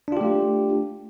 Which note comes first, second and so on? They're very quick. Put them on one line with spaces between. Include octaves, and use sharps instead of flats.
D4 F4 G4 A3